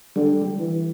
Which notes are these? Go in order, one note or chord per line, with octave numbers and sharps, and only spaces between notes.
D3 G3
E3